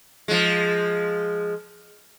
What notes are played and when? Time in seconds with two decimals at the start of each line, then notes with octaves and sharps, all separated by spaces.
0.28 F3 G#3